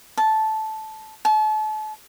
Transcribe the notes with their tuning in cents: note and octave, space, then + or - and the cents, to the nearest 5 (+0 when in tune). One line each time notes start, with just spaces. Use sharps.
A5 -10
A5 -35